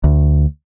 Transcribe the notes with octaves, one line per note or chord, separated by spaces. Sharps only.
D2